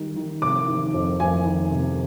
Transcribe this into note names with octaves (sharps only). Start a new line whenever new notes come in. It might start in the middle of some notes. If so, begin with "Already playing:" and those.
Already playing: D#3 G3
D#3
C3 D6
D#3
F2
F2 G#5
D#3
C3